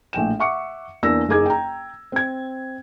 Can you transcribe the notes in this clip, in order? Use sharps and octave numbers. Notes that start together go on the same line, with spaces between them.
A#1 A2 G5 E7
E5 F#5 C#6 D6 C#7
E2 A#3 D4 G#5 E6 A#6
F#1 D#4 G#4 D6 G#6
G5 A#5
C4 G#6